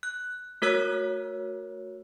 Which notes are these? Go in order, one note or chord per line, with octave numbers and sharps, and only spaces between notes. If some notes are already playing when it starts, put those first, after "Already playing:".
F#6
A3 F#4 A#4 C#5 E6 F#6